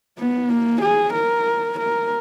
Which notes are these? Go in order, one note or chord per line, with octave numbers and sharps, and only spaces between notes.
B3
A#3
G#4
A#4
A#4